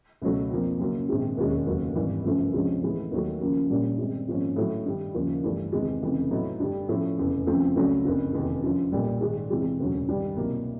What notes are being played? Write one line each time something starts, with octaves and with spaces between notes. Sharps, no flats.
C#2 B2 F#3 A3
F2 D3 F3 A#3
F#2 C#3 F#3 A#3
A#1 G#2 D#3 G#3 C4
E1 D#2 D#3 G#3 C#4
F1 D#2 C#3 F#3
G#1 G2 E3
G1 F#2 C#3 F3 A3
D2 C3 F3 G#3 C#4
A2 E3 G#3 B3
D#2 D#3 F#3 A3
F#1 F#2 C#3 F3 A#3
A#1 A#2 G3 A#3 C#4
G2 D#3 G#3 C4
G#1 G#2 F3 A#3 C#4
A2 F#3 A3
G2 D#3 G3
D#2 C#3 F3
G1 G2 E3 A3
E2 C3 D#3 G#3
F1 F2 C#3 E3
A2 F#3 B3 D#4
G2 D3 G3
A2 F3 A3 C#4
F1 E2 C#3
F#2 C#3 F3 A3 C4
C#2 C#3 F#3 A3 D4
F#1 F2 D3
F1 E2 C3 D#3
F#2 D3 F3
B1 A#2 G3
G#2 D#3 G#3
E2 C3 E3 G#3
E1 D2 C#3 F#3
G2 D#3 G3
C2 B2 F#3 A#3